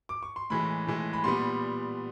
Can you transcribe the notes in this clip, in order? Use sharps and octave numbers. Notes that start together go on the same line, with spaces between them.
D6
C#6
C6
A2 E3 G#3 B5
A2 E3 G#3
B5
A#2 G3 B3 C6